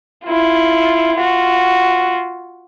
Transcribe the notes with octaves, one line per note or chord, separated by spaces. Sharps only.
E4 F4
F4 F#4